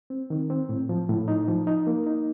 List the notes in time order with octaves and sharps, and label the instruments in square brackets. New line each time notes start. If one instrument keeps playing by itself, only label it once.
[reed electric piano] C4
D#3
C4
A2
F3
A2
D#4
F3
D#4
A#3
D#4